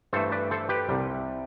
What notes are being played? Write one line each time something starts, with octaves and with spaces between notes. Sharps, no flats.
G2 E3 A3 A4 C5
B4 D5
A4 C5
G4 B4
C2 C3 G3